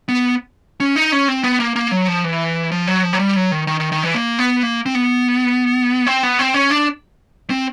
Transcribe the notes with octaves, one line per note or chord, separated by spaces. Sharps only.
B3
C#4
D#4
C#4
C4
B3
A#3
A#3
F#3
F3
E3
F3
F#3
F3
F#3
G3
F#3
D#3
D#3
D#3
D#3
E3
A#3
B3
A#3
C4
B3
C4
B3
C4
C#4
D4
C4